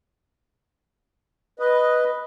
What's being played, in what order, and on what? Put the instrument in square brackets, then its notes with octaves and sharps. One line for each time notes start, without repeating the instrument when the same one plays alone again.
[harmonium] B4 D#5